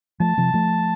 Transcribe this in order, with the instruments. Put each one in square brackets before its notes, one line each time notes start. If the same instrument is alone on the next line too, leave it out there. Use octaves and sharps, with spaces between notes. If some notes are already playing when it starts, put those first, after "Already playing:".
[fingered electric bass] F3 A3 [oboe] A5
[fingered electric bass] C3 F3
F3 A3